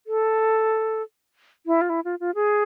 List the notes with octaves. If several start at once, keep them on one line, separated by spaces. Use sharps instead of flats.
A4
E4
F4
E4
F4
F4
G#4